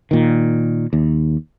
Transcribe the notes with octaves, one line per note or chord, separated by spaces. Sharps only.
A#2 D#3
D#2